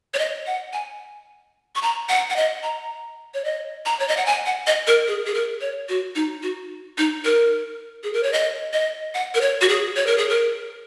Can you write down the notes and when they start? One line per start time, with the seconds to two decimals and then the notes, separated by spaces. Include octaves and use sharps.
0.14 C#5
0.19 D#5
0.47 F#5
0.73 G#5
1.75 C#6
1.82 A#5
2.09 F#5
2.30 F#5
2.36 D#5
2.63 A#5
3.34 C#5
3.44 D#5
3.86 A#5
4.00 C#5
4.08 D#5
4.17 F#5
4.26 G#5
4.46 F#5
4.67 D#5
4.87 A#4
5.07 G#4
5.26 G#4
5.34 A#4
5.61 C#5
5.89 F#4
6.16 D#4
6.43 F#4
6.98 D#4
7.25 A#4
8.04 G#4
8.13 A#4
8.23 C#5
8.33 D#5
8.73 D#5
9.15 F#5
9.35 A#4
9.41 C#5
9.61 F#4
9.69 G#4
9.96 C#5
10.07 A#4
10.18 G#4
10.29 A#4